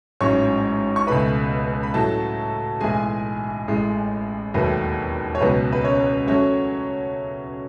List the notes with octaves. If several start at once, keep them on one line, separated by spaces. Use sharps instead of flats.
A1 G#2 F#3 C#4 E4 C#5 C#6
C#6
C#2 B2 A3 B4 B5
B5
A2 F#3 A3 A4 A5
B1 A2 E3 G#3 G#4 G#5
A1 A2 G#3
E1 D#2 D#3 F#3 A3 B4
C#5
C#2 B2 F#3 B3 B4
B4
C#4 C#5
F#3 A3 C#4 C#5